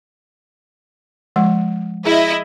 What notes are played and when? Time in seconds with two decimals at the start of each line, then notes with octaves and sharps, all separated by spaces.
1.36 F3 G#3 F#5
2.05 E4 G#4 D#5